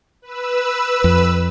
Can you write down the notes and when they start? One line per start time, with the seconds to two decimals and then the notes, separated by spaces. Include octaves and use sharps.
0.22 B4 E6
1.04 F2